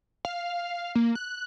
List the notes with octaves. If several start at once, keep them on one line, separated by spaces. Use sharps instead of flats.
F5
A#3
F#6